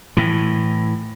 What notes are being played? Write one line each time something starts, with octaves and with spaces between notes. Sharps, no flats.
A2 E3